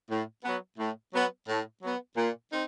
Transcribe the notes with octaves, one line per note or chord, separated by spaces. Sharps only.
A2
F#3 B3
A2
F#3 B3
A2
F#3 B3
A#2
C4 D#4